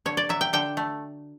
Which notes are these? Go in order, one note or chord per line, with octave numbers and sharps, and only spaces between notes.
D3 C#5
D5
F#3 E5
G5
D3 G5
A3